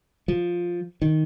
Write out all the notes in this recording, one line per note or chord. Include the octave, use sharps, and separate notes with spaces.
F3
D#3